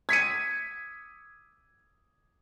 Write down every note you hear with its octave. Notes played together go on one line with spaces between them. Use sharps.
G#6 B6 C#7 D#7